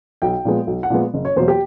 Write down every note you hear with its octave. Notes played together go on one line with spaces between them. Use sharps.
B1 G5
A#2 F3 G#3 B3
B1
F#5
A#2 F3 G#3 B3
F#1
C#5
E2 B2 F#3 A#3 C5
G4